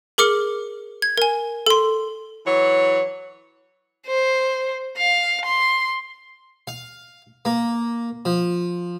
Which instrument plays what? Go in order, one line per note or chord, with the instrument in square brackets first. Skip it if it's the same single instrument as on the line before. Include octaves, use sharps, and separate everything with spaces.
[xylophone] G#4 A#4 D6 F6 C#7
G#6
A#4 G#5
A4 C6
[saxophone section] E3 F#3 C#5
[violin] C5
F5
C6
[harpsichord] F5
A#3
F3